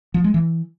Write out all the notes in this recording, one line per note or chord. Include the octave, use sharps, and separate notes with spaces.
F3
G#3
E3